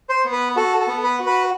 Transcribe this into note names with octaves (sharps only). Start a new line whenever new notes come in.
C5
B3
B4
F#4 A4
A4
B3
B4
F#4
B4